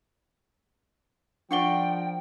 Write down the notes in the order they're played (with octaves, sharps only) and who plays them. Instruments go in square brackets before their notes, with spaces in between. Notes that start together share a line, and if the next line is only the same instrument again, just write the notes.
[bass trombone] F3 [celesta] D4 F#5 G7 [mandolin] A#4 D5 C#6 [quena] G5